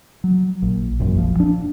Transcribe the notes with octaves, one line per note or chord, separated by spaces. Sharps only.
F#3
A#1
E1 A#1 F#2
F3
D4